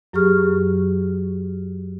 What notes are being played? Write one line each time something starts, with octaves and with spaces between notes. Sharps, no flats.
F#2 F#3 G4 G#4 C#6 F6